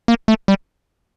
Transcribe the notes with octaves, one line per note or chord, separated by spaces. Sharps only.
A#3
A3
G3